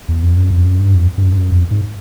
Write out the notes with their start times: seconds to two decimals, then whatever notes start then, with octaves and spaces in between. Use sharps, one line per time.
0.08 E2
0.23 F2
0.37 F#2
0.51 F2
0.65 F#2
0.79 G2
0.95 F2
1.18 G2
1.23 F#2
1.33 G2
1.37 F#2
1.52 F2
1.71 G#2